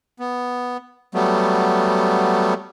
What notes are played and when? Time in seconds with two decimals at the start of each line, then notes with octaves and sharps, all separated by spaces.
0.19 B3
1.15 F#3 G3 A3 B3